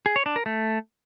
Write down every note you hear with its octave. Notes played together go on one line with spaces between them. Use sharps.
G#4
C#5
D4
A#4
A3